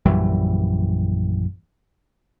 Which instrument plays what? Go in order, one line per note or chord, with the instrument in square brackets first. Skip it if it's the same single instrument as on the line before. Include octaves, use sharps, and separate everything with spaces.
[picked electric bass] A#1 F#2 E3 G3